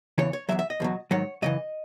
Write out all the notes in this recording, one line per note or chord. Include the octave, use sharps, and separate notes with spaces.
E2 C#3 E3 C#5
C#5
E2 C#3 F#3 E5
E5
D#5
E2 B2 F#3
G#2 D#3 F#3 C#5
F#2 C#3 E3 D#5